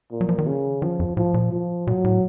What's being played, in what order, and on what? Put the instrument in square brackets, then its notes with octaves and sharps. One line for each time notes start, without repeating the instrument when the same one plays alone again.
[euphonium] A#2
[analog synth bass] F#3
F3
D#3
[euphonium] C#3
[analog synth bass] D#3 [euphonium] F3
[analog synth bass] F2
[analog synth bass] A2 [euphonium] F3
[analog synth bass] A#2
[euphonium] F3
[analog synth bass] A#2 [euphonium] F#3
[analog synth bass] A2